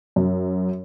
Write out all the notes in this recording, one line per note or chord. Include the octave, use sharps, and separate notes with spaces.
F#2